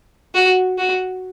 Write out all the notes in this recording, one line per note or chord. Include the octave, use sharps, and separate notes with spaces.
F#4
F#4